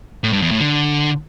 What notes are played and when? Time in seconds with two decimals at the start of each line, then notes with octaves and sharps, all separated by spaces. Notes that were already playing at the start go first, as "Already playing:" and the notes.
0.24 A2
0.33 G2
0.42 E2
0.51 A2
0.60 D3